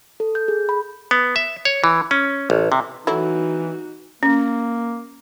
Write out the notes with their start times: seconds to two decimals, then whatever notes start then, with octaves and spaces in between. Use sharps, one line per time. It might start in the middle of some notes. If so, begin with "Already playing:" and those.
0.20 A4
0.35 G6
0.48 G#4
0.69 B5
1.11 B3
1.36 E5
1.65 C#5
1.84 E3
2.11 C#4
2.50 A1
2.72 C3
3.07 E3 F#3 A3 D#4 E4 F#4
4.23 A#3 C#4